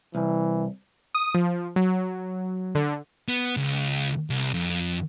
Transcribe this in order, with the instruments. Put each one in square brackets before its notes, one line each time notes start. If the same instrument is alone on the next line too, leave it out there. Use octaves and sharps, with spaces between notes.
[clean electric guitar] C2 [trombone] E3
[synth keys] D#6
F3
F#3
D3
[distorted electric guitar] B3
C#2
C2
F2